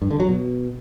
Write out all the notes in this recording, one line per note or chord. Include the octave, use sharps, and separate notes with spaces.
G2
D3
F#3
B2